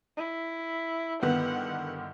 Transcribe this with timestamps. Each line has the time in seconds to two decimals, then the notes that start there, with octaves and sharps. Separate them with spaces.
0.17 E4
1.23 G2 D3 D#3 B3 F#5